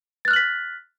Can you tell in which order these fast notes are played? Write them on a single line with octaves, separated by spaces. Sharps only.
A6 F#6 F6 F#7 B6